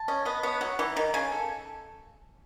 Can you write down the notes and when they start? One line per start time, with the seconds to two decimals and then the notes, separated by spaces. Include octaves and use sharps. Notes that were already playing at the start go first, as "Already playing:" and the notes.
Already playing: A5
0.08 C#4 D#5
0.25 B3 D#5
0.43 B3 C#5
0.61 F#3 F#5
0.79 E3 D#4
0.96 D#3 D#4
1.14 C#3 G#5
1.32 A4